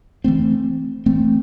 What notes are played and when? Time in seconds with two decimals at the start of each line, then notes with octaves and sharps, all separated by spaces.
0.24 E3 A3 C4
1.06 E3 A3 C4